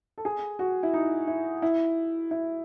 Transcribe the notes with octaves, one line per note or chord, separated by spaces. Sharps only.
A4
G#4
F#4
E4
D#4
E4
E4
E4